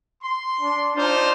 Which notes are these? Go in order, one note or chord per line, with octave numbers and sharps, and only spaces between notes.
C6
D4
D4 D#4 F4 C5